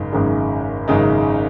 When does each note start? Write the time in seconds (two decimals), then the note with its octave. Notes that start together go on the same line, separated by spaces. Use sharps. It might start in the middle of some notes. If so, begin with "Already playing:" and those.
Already playing: G#1 F#2 C#3 G#3 D#4
0.12 G#1 F#2 C#3 G#3 D#4
0.88 G#1 F#2 C#3 G#3 D#4